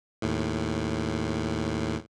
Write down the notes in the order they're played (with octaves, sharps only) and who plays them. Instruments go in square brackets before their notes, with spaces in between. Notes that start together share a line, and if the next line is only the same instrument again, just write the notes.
[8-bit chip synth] D#2 A2